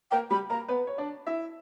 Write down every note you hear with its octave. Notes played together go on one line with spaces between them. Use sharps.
A#3 A#4 G5
G3 G4 B5
A#3 A#4 A#5
B3 B4
C#5
D4 D5
E4 E5